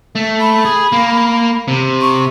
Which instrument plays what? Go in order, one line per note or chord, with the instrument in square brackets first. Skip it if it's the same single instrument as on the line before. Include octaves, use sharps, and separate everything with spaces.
[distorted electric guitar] A3
[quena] B5
[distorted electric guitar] G#4
A#3
C3
[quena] C#6